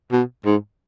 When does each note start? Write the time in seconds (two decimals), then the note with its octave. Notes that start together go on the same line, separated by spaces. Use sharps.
0.12 B2
0.45 G#2